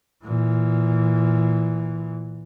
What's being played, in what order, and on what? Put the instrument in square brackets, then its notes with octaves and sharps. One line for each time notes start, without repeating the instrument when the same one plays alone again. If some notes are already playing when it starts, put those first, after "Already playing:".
[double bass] A#2 E3